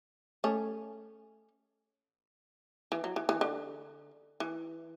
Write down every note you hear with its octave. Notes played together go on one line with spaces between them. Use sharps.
A3 C#4
E3
F#3
E3
E3
D3
E3